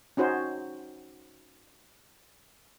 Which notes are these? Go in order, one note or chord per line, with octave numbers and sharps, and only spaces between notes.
C#4 D#4 F#4 C5